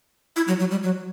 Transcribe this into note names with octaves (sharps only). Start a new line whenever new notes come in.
E4
F#3
F#3
G3
F#3